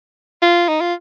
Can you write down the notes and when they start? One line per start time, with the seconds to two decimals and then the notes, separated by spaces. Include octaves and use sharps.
0.42 F4
0.69 D#4
0.81 F4